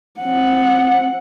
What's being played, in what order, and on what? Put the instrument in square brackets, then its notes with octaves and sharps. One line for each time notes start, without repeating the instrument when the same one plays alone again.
[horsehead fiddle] C4 F#5